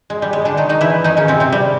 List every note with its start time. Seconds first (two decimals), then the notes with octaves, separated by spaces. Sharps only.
0.10 G#3
0.22 G3
0.33 G#3
0.45 D3 D4
0.57 D#3 D#4
0.69 D#3 D#4
0.81 E3 E4
1.04 D#3 D#4
1.17 C#3 C#4
1.28 C3 C4
1.40 C3 C4
1.52 G3